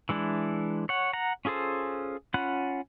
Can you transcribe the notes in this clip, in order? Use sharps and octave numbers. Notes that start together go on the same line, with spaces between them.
E3 G#3 D4 E4
C#5 F#5
F#5 A#5
C#4 F4 G#4 A4 C5
C#4 F4 F#5 B5 F#6